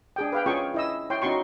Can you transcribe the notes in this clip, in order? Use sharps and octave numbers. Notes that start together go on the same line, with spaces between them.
D4 G#4 G5
B4 F5 G5
C#4 F4 G#4 G5 C#6
E4 D#5 E6
E4 C#5 G5 C6
C#4 D#4 F#4 C6 C#6